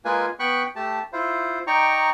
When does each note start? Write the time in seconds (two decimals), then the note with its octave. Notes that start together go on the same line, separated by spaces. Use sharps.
0.05 G#3 A#3 F4 B4 G#5
0.39 B3 G5 B5 C#6 F#6
0.76 A3 G4 A5
1.13 E4 F4 C5
1.67 D#4 D5 G5 A#5 C#6